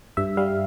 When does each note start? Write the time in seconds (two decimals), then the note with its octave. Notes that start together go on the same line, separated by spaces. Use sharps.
0.17 G2 E5
0.37 G3 F5